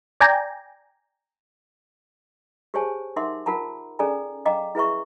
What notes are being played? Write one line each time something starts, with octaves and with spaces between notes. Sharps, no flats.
D5 G5 G#5 A#5
G4 G#4 C5 C#5 G#5 A5
D#4 A#4 E5 F#5 C6 D6
F4 A#4 F#5 A5 A#5
C#4 G#4 A4 D5 G#5 A#5
D#5 F5 G5 A#5 D6
E4 G#4 B4 E5 A#5 C#6